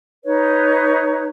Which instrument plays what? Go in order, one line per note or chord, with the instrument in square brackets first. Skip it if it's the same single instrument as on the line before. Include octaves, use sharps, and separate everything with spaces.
[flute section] D#4 B4 C#5